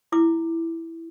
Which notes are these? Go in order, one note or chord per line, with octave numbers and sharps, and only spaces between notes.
E4 D6